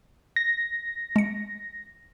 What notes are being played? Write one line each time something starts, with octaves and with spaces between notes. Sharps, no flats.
A#6
G#3 C#7